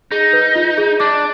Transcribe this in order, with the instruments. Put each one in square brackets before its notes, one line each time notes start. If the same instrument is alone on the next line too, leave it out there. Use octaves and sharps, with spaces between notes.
[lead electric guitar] D#4 [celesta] G#4
[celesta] B4
F4
G#4
[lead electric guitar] D4 [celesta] D6